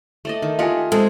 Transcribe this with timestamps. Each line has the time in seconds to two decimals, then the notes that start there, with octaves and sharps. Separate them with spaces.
0.25 A3 D5 D#5
0.42 D#3
0.59 F4 G4 D#5 F#5 G#5
0.92 G#3 C4 A4 C5